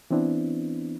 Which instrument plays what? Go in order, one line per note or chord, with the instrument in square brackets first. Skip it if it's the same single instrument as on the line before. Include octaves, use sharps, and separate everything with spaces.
[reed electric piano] E3 B3 C4 D4 E4